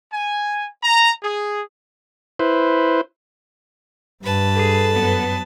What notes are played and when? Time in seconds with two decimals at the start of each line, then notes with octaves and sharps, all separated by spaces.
0.13 G#5
0.83 A#5
1.23 G#4
2.39 E4 B4 C5
4.23 G2 B4 A5
4.56 G#4 A4
4.93 F#2 B3